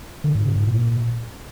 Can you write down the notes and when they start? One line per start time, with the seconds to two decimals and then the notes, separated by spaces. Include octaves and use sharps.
0.24 D3
0.35 G#2
0.45 C#3
0.56 G#2
0.67 A#2